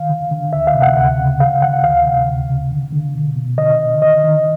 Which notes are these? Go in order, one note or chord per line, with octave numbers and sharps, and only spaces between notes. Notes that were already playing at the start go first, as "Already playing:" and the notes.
Already playing: D#3 F5
D3
D3
D2 E5
F5
C3
F#5
D2 F#5
C#3
D3 F5
D3 F#5
D2 F5
C3
D2
C#3
D3
D3
B2
B2
D3 D#5
D3
D#3 D#5
D#3